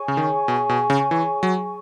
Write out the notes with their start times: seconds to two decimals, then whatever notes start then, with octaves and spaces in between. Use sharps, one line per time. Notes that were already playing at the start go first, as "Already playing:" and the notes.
Already playing: G#4 C#5 G#5 C#6
0.08 C#3
0.17 D#3
0.48 B2
0.69 B2
0.90 C#3
1.11 E3
1.43 F#3